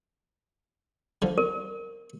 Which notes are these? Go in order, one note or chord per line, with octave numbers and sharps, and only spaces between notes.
D3 F3
A#4